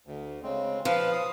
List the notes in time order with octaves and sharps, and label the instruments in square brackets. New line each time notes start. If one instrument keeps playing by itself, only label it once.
[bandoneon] D2
C#3 G#3 C4
[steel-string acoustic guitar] F3 [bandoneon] B4 F5
[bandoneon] D#6